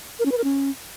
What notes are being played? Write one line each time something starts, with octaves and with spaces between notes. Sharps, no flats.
A#4
C#4
B4
A#4
C#4